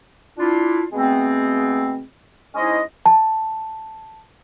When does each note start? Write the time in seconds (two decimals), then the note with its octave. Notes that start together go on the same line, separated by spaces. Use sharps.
0.38 D4 E4 F4
0.93 B2 G#3 A3 B3 C4
2.55 G#3 C#4 D#4 E4 C5 D#5
3.06 A5